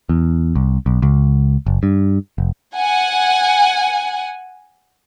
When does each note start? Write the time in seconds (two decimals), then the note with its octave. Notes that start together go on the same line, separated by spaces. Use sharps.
0.09 E2
0.55 C2
0.86 B1
1.02 C#2
1.66 F#1
1.83 G2
2.38 F1
2.75 F#5 G#5